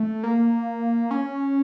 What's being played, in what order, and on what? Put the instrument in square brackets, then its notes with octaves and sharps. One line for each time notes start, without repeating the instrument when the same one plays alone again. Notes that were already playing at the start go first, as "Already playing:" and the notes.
Already playing: [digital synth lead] A3
A#3
C#4